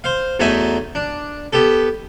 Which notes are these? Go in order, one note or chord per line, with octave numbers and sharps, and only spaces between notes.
C5 F5
E2 F#3 A3 D#4 E5 G#5
D4
B3 G4 A4